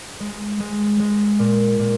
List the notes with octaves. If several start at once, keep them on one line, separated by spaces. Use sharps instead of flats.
G#3
G#3
G#3
A#2
A#2